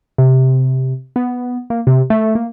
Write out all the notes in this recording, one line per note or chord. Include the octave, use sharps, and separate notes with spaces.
C3
B3
A#3
C3
A3
A#3